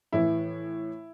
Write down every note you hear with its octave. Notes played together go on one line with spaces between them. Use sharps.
A2 E3 E4